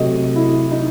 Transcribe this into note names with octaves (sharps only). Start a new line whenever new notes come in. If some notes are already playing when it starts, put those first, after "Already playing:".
Already playing: C3 F#3 A3 D#5
E4
D#4